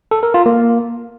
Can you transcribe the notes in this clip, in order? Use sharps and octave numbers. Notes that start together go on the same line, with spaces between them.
A4
A#4
F4
A#3